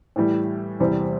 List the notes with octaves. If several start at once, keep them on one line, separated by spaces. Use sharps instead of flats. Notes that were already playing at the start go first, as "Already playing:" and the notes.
A2 E3 G3
E2 C3 E3 G3 C4